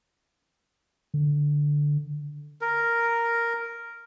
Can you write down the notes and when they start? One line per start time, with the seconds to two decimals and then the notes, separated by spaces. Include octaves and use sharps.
1.14 D3
2.61 A#4